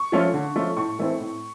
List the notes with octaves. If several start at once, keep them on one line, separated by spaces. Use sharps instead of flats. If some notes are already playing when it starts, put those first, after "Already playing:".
Already playing: C#6
F3 A3 C#4 F4
D3
F3 A3 C#4 F4
A2 C#6
E3 A3 C4 E4
A2